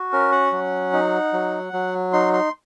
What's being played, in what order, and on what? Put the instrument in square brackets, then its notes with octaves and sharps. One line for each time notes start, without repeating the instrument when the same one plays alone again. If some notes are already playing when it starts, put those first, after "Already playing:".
Already playing: [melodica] F#4
C#4 A#4
F#5
F#3
D#4
F#3
F#3
D#4 C6
C6